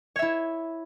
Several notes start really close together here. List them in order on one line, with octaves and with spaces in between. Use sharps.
C#5 E5 E4